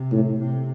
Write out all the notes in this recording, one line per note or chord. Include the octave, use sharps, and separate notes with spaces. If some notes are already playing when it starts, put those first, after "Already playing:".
Already playing: C3
A2
C3